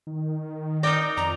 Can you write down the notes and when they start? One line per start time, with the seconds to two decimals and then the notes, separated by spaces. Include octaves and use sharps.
0.07 D#3
0.83 D#4 A#4 D5 G5 A#6
1.17 F2 A#5